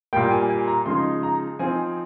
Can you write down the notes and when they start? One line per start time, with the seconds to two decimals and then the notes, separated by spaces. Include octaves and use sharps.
0.13 A#2 G3 A#3 G5
0.31 G#5
0.49 G#5
0.68 A#5
0.86 C#3 F3 G#3 D#4 C6
1.23 A#5
1.59 F3 C4 D#4 G#5